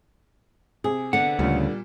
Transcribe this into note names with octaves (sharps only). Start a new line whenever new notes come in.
C3 G#4
D3 B3 F#5
D2 A#2 C#3 G3